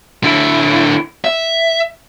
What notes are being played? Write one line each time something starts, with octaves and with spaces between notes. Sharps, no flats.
D3 E4
E5